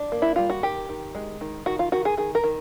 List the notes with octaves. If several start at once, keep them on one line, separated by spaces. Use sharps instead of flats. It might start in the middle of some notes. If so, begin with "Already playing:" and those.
Already playing: D4
A#3
E4
G3 F4
F#4
D#3 G4
D#3
G#3
D#3
D#3 F#4
F4
D#3 F#4
G#4
D#3 G#4
A#4
D#3